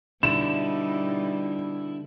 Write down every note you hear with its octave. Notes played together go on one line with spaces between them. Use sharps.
B2 D3 G3 D#4 E4 E7